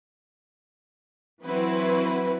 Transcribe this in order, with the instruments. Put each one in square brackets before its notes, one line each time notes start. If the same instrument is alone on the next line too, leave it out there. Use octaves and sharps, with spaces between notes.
[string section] E3 F#3 C4 E4 F#4 B4